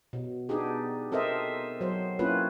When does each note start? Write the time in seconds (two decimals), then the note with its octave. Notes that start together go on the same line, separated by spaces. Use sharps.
0.13 B2
0.49 B3 D4 D#4 G4 G#4
1.12 C4 A4 A#4 C5 D#5 E5
1.81 F#3 C5
2.19 A#3 C4 C#4 E4 F4 B4